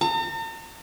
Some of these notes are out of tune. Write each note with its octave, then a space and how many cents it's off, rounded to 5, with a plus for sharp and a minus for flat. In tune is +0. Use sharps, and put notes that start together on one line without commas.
A#5 -45